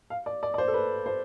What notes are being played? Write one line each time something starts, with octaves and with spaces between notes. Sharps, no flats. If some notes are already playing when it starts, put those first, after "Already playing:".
F5
D5
D5
D5
C5
A4
B4
C5